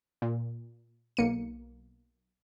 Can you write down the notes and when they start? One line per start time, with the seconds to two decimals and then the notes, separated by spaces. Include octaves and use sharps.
0.22 A#2
1.17 B1 A#3 C#7 D#7